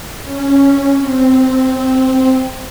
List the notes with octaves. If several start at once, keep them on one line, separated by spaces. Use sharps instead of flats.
C#4
C4